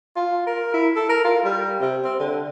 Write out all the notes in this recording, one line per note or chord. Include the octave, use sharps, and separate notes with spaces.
F4
A#4
E4
A4
A#4
F4
G3
C3
C4
D3